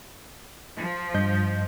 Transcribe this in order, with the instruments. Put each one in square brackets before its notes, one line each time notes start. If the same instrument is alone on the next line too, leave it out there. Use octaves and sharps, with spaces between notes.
[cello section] F3
[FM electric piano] G2 D#5 G6